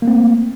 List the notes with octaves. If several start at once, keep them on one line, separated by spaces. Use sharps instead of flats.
A3 A#3 C4